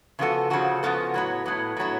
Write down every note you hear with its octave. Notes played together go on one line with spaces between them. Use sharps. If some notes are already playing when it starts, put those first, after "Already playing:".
C#3 F3 B3 F#4 A4
C#3 F3 B3 F#4 A4
C#3 F3 B3 F#4 A4
A2 F#3 B3
A2 F#3 B3
A2 F#3 B3